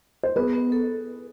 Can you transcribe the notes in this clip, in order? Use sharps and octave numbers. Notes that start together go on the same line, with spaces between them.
C5
B3 G#4 B4
B3
A4